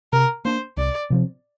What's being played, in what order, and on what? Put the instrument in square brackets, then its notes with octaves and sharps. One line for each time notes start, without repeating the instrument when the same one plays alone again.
[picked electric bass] C3 [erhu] A#4
[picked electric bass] A#3 D4 [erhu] C5
[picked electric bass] C2 [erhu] D5
[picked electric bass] C3 F3 C4